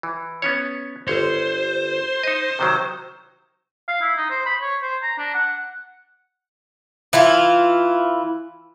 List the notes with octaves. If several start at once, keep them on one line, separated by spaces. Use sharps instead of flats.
E3
B3 C#4 C#5
G1 C5 C#5
D#4 D#5
C3 D#3 F#3
F5
E4
D#4
C5
B5
C#5
C5
A#5
D4
F#5
E3 E4 F4